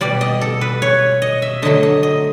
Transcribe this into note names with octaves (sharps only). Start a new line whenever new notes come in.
B2 G3 D5
D#5
A4
B4
C#5
D#5
E5
D3 F#3 A3 D#5
D#5
D#5